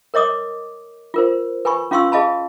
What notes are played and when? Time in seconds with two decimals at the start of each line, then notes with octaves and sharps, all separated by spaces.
0.14 A#4 C#5 D#5 D6 D#6
1.14 F4 A#4 C5
1.65 B4 G#5 B5 C#6
1.91 C#4 F4 F5 C6 C#6 E6
2.12 G#4 D#5 F5 A5 B5